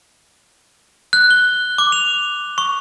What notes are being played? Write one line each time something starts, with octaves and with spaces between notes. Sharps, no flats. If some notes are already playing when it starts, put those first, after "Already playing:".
F#6
G7
D6
F7
C#6